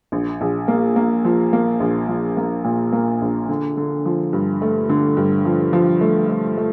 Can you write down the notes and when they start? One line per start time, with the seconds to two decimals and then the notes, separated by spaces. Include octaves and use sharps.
0.12 A#1
0.41 A#1
0.68 A#3
0.96 A#3
1.25 F3
1.53 A#3
1.80 A#1
2.08 F3
2.37 A#3
2.64 A#2
2.92 A#3
3.22 A#1
3.48 D3
3.77 D3
4.05 F3
4.33 G2
4.62 A3
4.89 D3
5.17 G2
5.45 F3
5.73 F3
6.01 A3
6.29 A3
6.58 A3